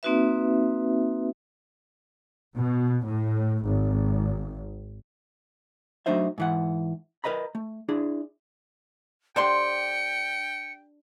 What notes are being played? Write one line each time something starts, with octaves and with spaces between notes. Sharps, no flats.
A#3 C4 D#4 F#4 B4 E5
B2
A2
G#1
F#3 A3 D4 D#4 C5 E5
G#2 E3 F#5
A#4 B4 D#5 A#5 B5
A3
D4 E4 G#4
D3 D4 G4 C5 G5 C6 C#7